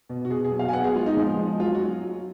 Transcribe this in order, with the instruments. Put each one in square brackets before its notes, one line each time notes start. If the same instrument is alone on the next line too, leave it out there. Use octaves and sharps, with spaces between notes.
[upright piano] B2
F#4
B2 G#4
G#4
F#3
F5
G#5
B3 F#5
G#4
G#3 F4
D#4
F3
G#3
F#3 F4
F#4
F#3